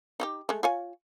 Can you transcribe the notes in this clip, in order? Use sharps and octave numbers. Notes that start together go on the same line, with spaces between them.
D#4 F#4 G4
G#3 A3
F4 C#5 G#5